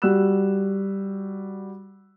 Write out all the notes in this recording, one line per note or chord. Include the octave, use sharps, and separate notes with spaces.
G3 F#4 E6 F#6 E7